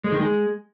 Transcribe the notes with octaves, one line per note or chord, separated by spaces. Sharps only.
G#3
D#3
G#3